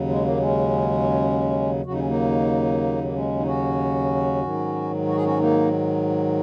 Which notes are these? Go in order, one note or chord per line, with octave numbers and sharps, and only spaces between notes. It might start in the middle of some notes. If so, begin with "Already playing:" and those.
Already playing: D#2 C#3 F#3
G#3
A#3
G#3 C#4
D#2 C#3 F#3 F#4
D#4
C#4
A#3 D#4
A#3
G#3 C#4
D#4
C#4 F#4
G#2 D#3 F#3
F#4
G#4
C#4 F#4
A#3 D#4